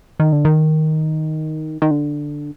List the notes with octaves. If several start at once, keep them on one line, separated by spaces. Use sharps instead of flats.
D#3
D3
D#3
D#3
D3